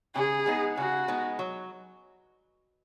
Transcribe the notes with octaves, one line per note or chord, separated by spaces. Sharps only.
C#3 G#4
G#3 B3 D#4
C#3 F#4
G#3 B3 D#4
F#3